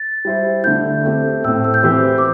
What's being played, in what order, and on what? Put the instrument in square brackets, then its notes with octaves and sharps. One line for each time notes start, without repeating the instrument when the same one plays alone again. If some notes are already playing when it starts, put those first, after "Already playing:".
Already playing: [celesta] A6
[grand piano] G3 E4 C5
[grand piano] D3 A3 E4 [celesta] G6
[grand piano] A3 C4 G4
[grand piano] A2 A3 C4 [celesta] E6
[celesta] E6
G6
[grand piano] E3 C4 G4 C5 [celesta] E6
[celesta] D6